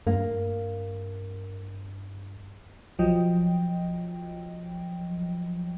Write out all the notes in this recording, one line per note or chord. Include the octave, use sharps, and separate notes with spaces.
G2 A#3
B1 F3 F#3 D#5 G5